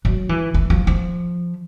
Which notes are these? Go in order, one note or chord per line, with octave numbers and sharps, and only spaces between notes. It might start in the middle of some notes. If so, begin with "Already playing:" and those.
F#3
E3
E3
F3
F3